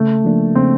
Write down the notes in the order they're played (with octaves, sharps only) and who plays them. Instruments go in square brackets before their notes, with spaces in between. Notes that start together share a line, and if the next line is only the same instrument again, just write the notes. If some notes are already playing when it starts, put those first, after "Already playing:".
Already playing: [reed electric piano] C#3 [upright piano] A3
[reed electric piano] F3 A#3 D4
[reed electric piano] C#3 [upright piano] C4